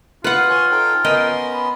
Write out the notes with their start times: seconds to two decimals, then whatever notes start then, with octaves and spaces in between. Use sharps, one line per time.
0.24 F4 B4 F#5
0.50 C#5 G#5 C6
0.71 D#4 A4 G5
1.04 B3 C#4 A#4 D#5 G5 C6
1.51 B5